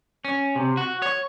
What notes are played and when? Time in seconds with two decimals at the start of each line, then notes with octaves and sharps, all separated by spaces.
0.25 C#4
0.56 C3
0.77 F#4
1.02 C#5